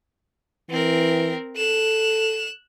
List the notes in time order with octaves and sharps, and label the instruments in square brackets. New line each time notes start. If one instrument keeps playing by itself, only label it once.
[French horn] E3 [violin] C4 A#4
[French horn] A4 [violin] F#6 E7